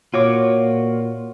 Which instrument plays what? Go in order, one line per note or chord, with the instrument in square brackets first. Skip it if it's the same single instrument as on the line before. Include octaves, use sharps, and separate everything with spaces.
[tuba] A#2 [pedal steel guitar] F4 F#4 D6 [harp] C#5